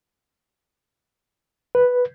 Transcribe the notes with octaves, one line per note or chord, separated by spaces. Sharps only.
B4